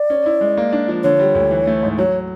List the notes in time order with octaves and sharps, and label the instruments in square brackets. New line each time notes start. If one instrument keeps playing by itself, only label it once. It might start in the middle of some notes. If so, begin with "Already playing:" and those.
Already playing: [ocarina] D5
[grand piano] C#4
E4
G#3
A#3
D4
F3
[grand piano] D3 [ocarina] C#5
[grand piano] G3
D2
E3
A3
G#2
[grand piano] F#3 [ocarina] C#5